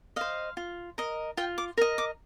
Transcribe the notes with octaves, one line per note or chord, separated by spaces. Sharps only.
C5 D#5 F5
F4
A#4 D#5
F4 G5
D6
A#4 D#5
D6